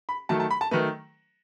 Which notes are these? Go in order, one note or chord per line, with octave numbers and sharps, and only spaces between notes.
B5
D#3 F#3 A3 A5
A5
B5
A5
D#3 F#3 A3 B4